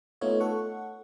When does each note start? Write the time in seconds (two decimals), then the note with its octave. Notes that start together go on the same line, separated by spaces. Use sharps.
0.21 A3 B3 D#4 F4 C#5
0.40 A4 F#5 C#6